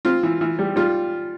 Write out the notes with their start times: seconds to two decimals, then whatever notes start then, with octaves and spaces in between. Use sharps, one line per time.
0.05 C4 F4
0.23 E3
0.41 E3
0.59 G3
0.76 G3 F4